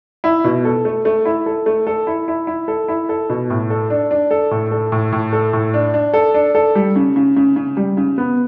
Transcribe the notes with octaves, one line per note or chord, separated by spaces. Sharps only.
E4
B2
A4
A3
A3
E4
A4
A3
A4
E4
E4
E4
A4
E4
A4
B2
A2
A4
D4
D4
A4
A2
A4
A2
A2
A4
A2
D4
D4
A4
D4
A4
G3
C#3
C#3
C#3
C#3
G3
C#3
B3